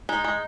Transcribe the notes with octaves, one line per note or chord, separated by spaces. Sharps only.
G#3 D#4
G#3